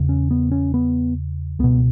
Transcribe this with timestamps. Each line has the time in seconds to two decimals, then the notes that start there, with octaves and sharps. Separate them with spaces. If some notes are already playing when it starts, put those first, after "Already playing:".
Already playing: E2 C#3
0.09 C#4
0.31 B3
0.52 C#4
0.74 B3
1.59 C#2 B2 B3